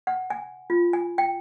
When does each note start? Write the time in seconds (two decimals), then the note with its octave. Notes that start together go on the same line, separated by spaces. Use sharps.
0.07 F#5
0.30 G#5
0.70 F4
0.93 G#5
1.18 G5